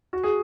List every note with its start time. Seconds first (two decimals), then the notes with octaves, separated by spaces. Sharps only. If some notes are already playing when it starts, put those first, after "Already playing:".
0.13 F#4
0.23 G#4